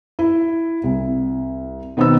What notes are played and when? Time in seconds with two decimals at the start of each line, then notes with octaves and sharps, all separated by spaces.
0.19 E4
0.84 C2
1.97 B2 D#3 B3 C4 D#4 E6